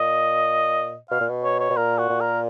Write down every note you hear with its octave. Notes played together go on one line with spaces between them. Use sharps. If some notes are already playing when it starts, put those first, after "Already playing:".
Already playing: A#2 D#5
B2 F5
A#2
B2
C#5
C#5
B2
A#2 A#4
F#4
A#2
A#4